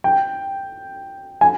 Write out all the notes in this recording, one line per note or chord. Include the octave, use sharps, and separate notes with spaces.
G5
G#5